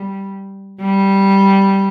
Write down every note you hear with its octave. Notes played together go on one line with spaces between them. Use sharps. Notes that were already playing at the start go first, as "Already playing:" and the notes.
Already playing: G3
G3